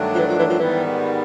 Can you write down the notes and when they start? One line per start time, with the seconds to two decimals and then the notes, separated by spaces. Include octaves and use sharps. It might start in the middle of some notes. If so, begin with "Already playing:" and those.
Already playing: G2 D#3 F#3 A3 D4
0.15 F3
0.19 E3
0.30 F3
0.39 E3
0.50 F3
0.59 G#2 D#3 E3 G3 B3